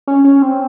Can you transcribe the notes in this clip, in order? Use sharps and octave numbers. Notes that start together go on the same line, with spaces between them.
C#4
C#4
C4